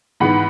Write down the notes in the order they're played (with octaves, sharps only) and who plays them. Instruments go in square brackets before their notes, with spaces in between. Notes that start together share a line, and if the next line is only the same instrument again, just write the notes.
[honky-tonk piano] G#2 E3 B3 F#5 B5